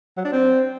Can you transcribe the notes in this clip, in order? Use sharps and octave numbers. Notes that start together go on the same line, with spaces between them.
F#3
D4
C4